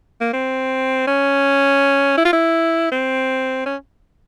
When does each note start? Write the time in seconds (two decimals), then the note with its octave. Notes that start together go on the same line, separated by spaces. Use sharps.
0.21 A#3
0.33 C4
1.07 C#4
2.17 E4
2.25 F4
2.33 E4
2.91 C4
3.66 C#4